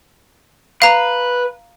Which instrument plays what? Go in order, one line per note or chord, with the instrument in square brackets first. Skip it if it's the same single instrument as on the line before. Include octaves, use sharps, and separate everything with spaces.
[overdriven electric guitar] B4 [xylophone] F5 A#5